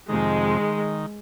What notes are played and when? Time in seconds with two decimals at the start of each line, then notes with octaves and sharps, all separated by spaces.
0.09 F2 C3 D#3 G#3
0.60 D#3